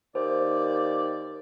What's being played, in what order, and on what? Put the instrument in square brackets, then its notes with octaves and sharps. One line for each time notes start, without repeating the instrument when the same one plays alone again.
[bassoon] D#2 [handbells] C5 [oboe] D5